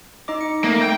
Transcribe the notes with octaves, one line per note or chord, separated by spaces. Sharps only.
D#4 D#5 D6
C#7
A3 A#3
G5